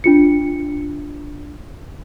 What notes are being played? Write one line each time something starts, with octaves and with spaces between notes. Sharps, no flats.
D4 F4 C#7